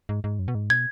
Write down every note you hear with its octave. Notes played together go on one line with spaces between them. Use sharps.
G#2
G#2
F#2
B2
G#2
B2 G#6